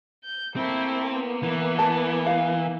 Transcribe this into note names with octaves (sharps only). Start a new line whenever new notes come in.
G6
A3 A#3 C4 E4
A#3 B3
E3
A5
F5